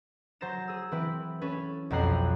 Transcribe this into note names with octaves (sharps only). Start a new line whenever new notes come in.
F#3 C5 A#5 A6 A#6 E7
G#4 E6
E3 C4 E4 B4
C#4 A4 B4
B1 F2 C4 A#5 F#6 C7